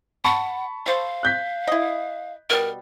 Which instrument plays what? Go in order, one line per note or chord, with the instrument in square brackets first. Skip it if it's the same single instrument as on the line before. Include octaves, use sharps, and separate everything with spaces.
[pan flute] F#5 [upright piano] A5 B5 C#6
[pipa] A4 C5 [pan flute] F5
[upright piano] F#6 G6 B6
[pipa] E4 D#5
[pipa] B2 G3 [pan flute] A#4